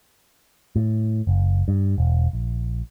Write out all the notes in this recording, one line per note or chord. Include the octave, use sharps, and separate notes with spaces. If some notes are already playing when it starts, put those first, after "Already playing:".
A2
F#1
G2
E1
A#1